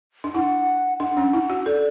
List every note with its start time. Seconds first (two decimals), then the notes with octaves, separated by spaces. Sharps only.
0.24 D4
0.34 E4 F#5
1.00 D4 F#5
1.17 C#4
1.33 E4
1.50 F#4
1.66 A4 D5